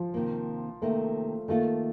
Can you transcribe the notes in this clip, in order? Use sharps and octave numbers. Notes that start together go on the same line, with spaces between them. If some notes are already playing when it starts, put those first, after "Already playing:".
Already playing: F3
C3 D#3 A#3
C3 D#3 A3 A#3
D#3 A3 A#3 F4 A4